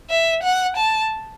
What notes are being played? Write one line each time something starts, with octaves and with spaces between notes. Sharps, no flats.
E5
F#5
A5